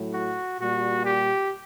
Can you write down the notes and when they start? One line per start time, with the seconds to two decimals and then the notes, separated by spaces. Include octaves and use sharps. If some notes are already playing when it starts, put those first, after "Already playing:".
Already playing: A2 F#3
0.13 F#4
0.58 A#2 G3 F#4
1.03 G4